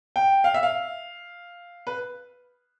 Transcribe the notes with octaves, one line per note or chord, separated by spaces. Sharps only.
G5
F5
E5
F5
B4